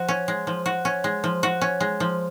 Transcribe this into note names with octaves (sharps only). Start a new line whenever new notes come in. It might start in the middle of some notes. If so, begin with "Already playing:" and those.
Already playing: F3 F#4
C#4
G#3
F3
F#4
C#4
G#3
F3
F#4
C#4
G#3
F3